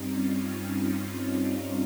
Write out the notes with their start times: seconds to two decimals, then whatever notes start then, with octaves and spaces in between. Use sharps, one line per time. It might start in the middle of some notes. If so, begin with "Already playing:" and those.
Already playing: G2 G3 C4 D#4
0.09 C#4 F4